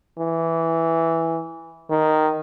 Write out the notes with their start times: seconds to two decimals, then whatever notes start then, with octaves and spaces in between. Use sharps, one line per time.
0.19 E3
1.91 D#3